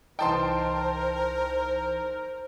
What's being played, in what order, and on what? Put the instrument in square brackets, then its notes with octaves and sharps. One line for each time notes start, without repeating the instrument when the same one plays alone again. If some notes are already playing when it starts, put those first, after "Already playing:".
[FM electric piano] C2 E3 D#4 [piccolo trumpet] A#4 [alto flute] C5 [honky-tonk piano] G5 A5 C6